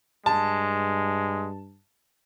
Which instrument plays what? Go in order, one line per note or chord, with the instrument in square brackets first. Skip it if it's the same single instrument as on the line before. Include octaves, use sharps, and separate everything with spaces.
[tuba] G2 [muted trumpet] G#3 [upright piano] A5